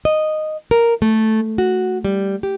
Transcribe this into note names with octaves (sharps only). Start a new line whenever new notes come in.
D#5
A#4
A3
F#4
G3
G4